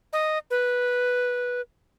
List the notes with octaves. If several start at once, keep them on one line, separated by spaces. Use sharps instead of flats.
D#5
B4